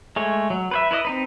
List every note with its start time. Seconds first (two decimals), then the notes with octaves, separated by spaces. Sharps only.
0.16 G#3 A3 C#5
0.50 F#3
0.71 B4 C5 E5
0.91 E4 B4 C#5 D#5
1.05 C4 D#4 B4